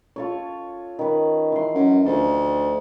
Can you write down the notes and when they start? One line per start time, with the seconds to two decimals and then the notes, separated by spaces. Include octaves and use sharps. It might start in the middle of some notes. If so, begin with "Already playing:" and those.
0.16 F4 A4 C#5
0.99 D#3 B4
1.52 E3 C6
1.75 F#2
2.06 D2 F3 A5